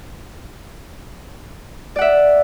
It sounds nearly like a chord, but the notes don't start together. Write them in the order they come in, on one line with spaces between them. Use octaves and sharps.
D5 F#5 E5